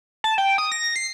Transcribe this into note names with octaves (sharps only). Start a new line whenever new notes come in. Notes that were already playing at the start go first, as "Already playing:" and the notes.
A5
G5
D#6
A#6
C7